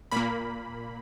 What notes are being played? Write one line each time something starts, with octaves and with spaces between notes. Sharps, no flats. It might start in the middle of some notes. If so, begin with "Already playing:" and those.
A#2 A#3 B5